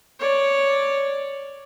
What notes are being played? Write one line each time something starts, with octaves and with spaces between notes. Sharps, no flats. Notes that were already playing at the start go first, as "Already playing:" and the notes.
C#5 D5